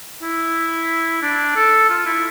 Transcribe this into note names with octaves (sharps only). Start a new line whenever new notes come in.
E4
D4
A4
F4
E4